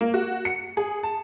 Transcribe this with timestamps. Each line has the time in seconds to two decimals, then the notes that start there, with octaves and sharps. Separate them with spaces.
0.01 A#3
0.14 F#4
0.45 C#7
0.77 G#4
1.03 A5